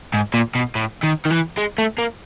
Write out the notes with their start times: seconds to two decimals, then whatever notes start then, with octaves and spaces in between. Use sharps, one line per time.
0.14 G#2
0.34 A#2
0.55 B2
0.75 A2
1.03 D#3
1.25 D#3
1.30 E3
1.57 G#3
1.78 A3
1.99 A#3